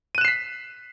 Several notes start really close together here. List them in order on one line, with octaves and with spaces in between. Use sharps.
D#7 F#6 E7 C7 B6